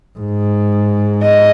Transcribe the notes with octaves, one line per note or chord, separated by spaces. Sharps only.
G#2
D#5